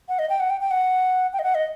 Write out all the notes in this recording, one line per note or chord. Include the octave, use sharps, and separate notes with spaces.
F#5
D#5
G5
F#5
G5
G5
F#5
G5
D#5
F#5
D#5